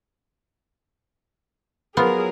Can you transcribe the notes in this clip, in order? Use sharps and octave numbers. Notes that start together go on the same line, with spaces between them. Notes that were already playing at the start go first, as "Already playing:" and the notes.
F3 F#3 B3 F4 G#4 A#4